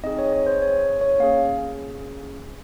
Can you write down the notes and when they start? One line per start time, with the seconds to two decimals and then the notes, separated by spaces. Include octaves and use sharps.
0.03 C4 D#4 G#4 D#5
0.18 C#5
0.33 C#5
0.47 C5
0.62 C#5
1.01 C#5
1.20 A#3 C#4 G#4 F5